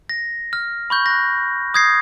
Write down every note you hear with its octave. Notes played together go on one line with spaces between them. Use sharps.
A#6
F6
B5 C#6 G6
F#6 A#6
D#6 G6 G#6 A#6 C7